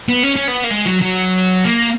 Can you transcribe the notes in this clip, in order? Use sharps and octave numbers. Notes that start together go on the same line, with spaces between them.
B3
C#4
C#4
B3
A#3
G#3
F#3
F#3
A#3